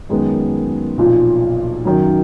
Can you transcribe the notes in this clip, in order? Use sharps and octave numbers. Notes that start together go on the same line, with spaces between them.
F#2 D#3 G#3 B3
B1 A#2 F3
F#2 D#3 F#3